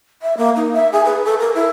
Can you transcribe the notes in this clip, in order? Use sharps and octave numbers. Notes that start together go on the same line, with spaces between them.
E5
A#3
D#4
E5
G#4
B4
A4
A#4
E4